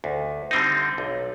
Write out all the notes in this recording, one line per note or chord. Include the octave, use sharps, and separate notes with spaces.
D2
D3 G3 C4 D#4
B1